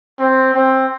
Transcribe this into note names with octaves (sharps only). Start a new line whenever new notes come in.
C4
C4